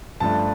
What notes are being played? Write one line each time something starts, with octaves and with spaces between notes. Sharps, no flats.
G2 F3 A3 D4 A5